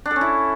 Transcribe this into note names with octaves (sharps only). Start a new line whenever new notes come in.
D4
A4
C#4
E4